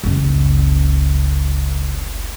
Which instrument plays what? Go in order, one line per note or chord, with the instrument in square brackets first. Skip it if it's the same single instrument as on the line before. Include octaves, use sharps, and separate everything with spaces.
[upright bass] F#1 C#2